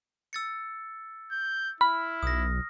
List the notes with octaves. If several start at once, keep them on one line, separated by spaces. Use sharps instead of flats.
E6 A6 C#7
G6
E4 B5 F6
B1 D#6 A#6